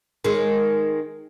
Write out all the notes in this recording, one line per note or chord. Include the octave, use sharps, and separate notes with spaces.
D#3 G#3